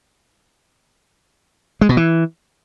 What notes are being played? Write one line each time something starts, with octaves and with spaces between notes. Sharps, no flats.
G#3
B2
E3